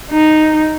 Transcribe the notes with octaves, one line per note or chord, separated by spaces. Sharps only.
D#4